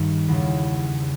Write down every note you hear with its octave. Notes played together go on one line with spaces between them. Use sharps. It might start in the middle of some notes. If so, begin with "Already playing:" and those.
Already playing: G2 D#3
E2 C#3 E3